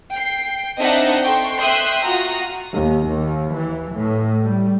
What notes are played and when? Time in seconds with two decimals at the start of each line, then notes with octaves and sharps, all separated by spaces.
0.12 G5 C7
0.79 C4 D4 D#4 D#5 E5 F#5
1.24 A4 G5 C6 C#6
1.60 E5 G5 C6 D#6 F#6
2.03 F4 F#4 F#5 A#5 D#6
2.73 D#2
3.07 D#2
3.55 E3
3.94 A2
4.41 G3